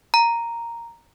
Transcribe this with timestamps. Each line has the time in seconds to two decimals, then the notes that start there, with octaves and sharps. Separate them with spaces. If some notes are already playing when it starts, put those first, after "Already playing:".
0.14 A#5